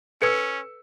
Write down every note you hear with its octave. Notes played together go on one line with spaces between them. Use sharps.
C#4 A4 B4 E6 G#6 C#7